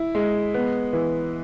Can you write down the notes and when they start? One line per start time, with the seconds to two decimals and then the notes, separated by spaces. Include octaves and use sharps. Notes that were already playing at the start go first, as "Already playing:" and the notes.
Already playing: E4
0.15 G#3
0.54 B3
0.93 E3